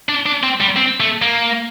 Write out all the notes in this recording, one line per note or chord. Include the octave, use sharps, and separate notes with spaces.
D4
D4
C4
G3
C4
A3
A#3